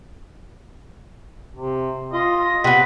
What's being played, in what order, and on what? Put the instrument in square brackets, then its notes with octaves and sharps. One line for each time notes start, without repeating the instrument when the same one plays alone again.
[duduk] C3
[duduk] F4 [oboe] D#5
[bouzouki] C3 B3 [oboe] B4